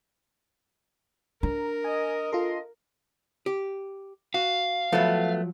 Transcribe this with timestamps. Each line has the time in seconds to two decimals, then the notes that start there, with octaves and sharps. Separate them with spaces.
1.43 D4 A#4 A#5
1.84 D#5 G#5
2.32 F4 A4 D#5 C6
3.46 G4
4.34 F#4 F5
4.92 F3 F#3 A3 B3